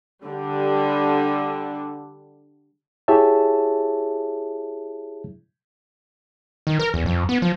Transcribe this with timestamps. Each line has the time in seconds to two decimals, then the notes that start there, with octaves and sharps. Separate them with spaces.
0.24 D3 G3
3.08 E4 G4 G#4 C#5 E5 A5
6.67 D#3
6.79 A#4
6.94 E2
7.06 F2
7.29 B3
7.42 F3